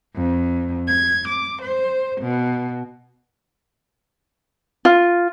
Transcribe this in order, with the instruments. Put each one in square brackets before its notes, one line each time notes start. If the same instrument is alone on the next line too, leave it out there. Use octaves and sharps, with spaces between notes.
[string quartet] F2
G#6
D6
C5
B2
[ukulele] F4